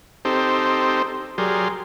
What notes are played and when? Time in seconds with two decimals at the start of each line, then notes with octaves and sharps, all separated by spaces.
0.25 C4 D#4 G4 A4 C5
1.38 F#3 G4 G#4 A#4 D5 C6